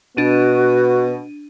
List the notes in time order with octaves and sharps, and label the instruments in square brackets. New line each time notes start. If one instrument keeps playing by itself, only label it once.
[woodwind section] B2 [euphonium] B3 [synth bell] D4 D#7 [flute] F#4